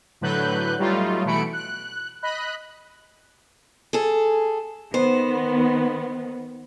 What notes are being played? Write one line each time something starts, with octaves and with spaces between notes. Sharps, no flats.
A2 D3 F#3 B4 F#6 G6
F#3 G3 A3 D#4 F4
B2 E3 A3 B5 C#7 D7
F#6
D#5 B5 F#6
G#4 A4
D#3 B3 C5